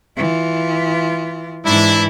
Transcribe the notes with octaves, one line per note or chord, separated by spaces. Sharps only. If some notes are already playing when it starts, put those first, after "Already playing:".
E3 F4
G#2 E3 D4 E4